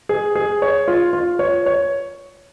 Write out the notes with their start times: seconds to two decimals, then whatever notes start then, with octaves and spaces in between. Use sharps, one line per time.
0.09 G#4
0.35 G#4
0.62 C#5
0.88 F4
1.13 F4
1.39 C#5
1.66 C#5